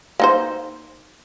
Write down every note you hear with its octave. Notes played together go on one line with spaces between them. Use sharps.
A#3 D#4 C5